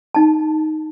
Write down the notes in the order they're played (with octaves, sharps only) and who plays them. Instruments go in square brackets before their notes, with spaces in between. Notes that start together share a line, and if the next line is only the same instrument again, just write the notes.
[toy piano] D#4 A5